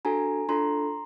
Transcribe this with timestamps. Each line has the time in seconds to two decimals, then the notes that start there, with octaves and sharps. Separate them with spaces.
0.05 D4 F#4 A4 G#5 A#5
0.49 D4 F4 A4 A#5 C6